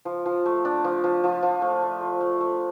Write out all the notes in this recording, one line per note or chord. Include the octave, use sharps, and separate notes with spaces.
F3
F3
A3
D4
F3
F3
F3
F3
A3
A3
A3
A3
A3